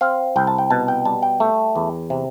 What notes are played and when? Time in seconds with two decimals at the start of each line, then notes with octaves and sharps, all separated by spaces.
0.01 C4 F5
0.36 C2 G5
0.47 A5
0.58 G5
0.70 B2 A5
0.88 G5
1.05 G3 A5
1.23 G5
1.40 A3
1.76 E2
2.10 C3